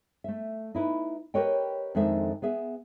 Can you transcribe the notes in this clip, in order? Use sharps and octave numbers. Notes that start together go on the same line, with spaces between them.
A3 E5
D#4 E4 B4
G4 A#4 B4 C#5 D#5 G5
F2 D#3 G#3 D4 A4 E5
B3 G#4 E5